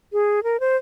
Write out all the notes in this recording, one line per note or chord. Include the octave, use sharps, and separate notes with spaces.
G#4
A#4
C5